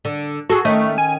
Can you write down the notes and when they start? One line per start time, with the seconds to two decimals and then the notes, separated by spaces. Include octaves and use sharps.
0.05 D3
0.50 F#4 G#4 A4
0.65 D#3 A3 C#4 D#5
0.98 G#5